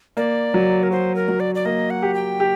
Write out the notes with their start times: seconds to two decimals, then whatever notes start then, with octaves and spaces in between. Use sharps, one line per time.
0.17 A#3 D5
0.54 F#3
0.83 A#4
0.91 F#4 C5
1.15 A#4
1.28 F#3
1.40 D5
1.55 D5
1.65 A#3 D#5
1.90 F#5
2.02 G4
2.14 G5
2.40 G4